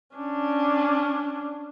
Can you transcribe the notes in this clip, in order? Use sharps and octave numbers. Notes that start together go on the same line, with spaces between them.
C#4 D4